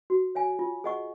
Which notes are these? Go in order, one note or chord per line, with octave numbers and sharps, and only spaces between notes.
F#4
C#5 F5 G#5
F4
G#4 D#5 F#5 C#6